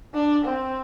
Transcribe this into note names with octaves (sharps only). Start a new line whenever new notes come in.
D4
C4